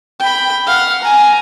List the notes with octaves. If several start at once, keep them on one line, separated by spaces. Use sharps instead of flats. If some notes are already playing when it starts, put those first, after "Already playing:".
G5 B5
F5 F#5
G#5 A#5